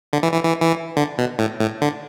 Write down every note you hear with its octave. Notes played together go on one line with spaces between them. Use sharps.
D3
E3
E3
E3
E3
D3
B2
A2
A2
D3